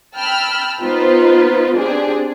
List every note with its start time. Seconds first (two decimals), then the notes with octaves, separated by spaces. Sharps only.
0.15 G5 A5 B5 E6 F6
0.81 B3 D#4 F4 B4 C5
1.76 C4 D4 G4 G#4 C5